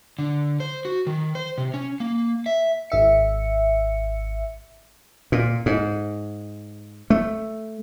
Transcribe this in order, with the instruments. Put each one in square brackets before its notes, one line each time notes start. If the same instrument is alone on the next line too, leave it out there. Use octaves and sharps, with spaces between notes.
[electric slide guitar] D3
C5
F#4
D#3
C5
C3
C#4
A#3
E5
[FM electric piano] G#1 E5 C#7
[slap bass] A#2
G#2
A3